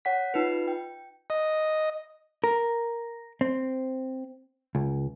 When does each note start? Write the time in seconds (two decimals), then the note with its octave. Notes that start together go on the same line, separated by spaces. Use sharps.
0.05 C#5 F#5 B6
0.34 D#4 F4 B4
0.68 G5
1.30 D#5
2.44 A#4
3.41 C4
4.75 C#2